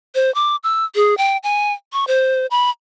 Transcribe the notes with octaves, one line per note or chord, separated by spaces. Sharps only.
C5
D6
E6
G#4
G5
G#5
C#6
C5
B5